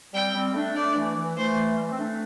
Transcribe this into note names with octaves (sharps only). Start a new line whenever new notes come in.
G3 C4 G5
G3 C4
A3 D4
A3 D4 D5
E3 A3
E3
E3 A3 C5
G3
A3
C4
A3 D4